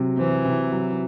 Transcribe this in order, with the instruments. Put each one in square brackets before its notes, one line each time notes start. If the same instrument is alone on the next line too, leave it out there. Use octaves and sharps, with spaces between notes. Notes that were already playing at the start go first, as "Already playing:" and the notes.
Already playing: [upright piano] C3 F#3
[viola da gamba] E3 [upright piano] C4
[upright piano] C3
F#3